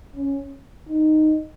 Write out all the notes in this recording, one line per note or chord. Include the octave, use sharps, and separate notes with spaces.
C#4
D#4